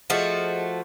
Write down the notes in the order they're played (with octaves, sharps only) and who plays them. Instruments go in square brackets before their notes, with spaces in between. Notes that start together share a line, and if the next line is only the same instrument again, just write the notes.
[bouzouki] F3 A3 F#4 [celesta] G#4 D#5